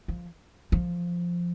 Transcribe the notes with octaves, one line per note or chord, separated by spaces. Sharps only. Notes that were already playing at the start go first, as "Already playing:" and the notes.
F3
F3